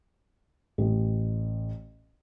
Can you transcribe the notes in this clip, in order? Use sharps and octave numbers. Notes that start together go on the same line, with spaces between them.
A1